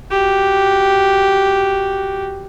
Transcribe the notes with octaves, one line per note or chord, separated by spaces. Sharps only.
F#4 G4